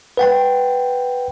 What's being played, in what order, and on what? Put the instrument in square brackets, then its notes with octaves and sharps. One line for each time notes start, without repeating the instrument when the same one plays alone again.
[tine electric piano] B4 F#5 G5